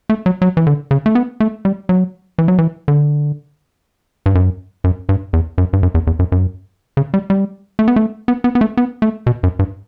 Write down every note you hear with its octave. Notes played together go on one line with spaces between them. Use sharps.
A3
F#3
F#3
E3
D3
C#3
A3
B3
A3
G3
F#3
E3
F#3
E3
D3
G2
F#2
F#2
G2
E2
F#2
G2
F#2
E2
E2
F#2
F#2
C#3
G3
G3
A3
B3
A3
B3
B3
B3
A3
B3
A3
B2
F#2
G2